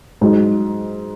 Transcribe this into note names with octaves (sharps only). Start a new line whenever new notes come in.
G#2 F#3 D#4